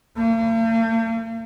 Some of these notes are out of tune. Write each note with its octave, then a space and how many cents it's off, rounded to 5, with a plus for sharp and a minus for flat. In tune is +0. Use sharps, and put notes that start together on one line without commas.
A#3 -45